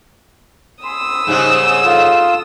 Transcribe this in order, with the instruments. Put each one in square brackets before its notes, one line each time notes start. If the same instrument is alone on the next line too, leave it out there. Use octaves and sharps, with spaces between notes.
[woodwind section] G#5 B5 C6 [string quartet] D#6 E6
[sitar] G#2 C#3 G3 [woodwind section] C5
[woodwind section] D4 D#4 A4 [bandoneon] F4